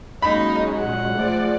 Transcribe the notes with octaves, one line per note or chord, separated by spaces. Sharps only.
F#3 G#3 A#3 C#4 D#4 B5
A#2 F#5
F3 A3 G#4 D5